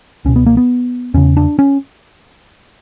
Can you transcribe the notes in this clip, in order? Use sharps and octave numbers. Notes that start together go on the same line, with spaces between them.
C#2 B2 C#4
B3
A#3
B3
E2 C#3 C#4
D4
C#4